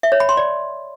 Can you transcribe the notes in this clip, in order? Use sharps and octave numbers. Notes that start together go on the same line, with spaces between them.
E5
C#5
B5
C6
D5